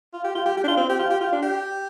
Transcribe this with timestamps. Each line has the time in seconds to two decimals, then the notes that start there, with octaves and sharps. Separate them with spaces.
0.13 F4
0.24 G4
0.35 F4
0.45 G4
0.57 G4
0.64 D4
0.68 F4
0.77 C4
0.89 G4
0.99 F4
1.10 G4
1.21 F4
1.33 D4
1.42 G4